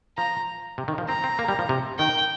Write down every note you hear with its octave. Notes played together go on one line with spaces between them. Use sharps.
F3 A#5
C3
D#3
F3
C4 A#5
C4
A#3
G3
F3
C3
D#3 G5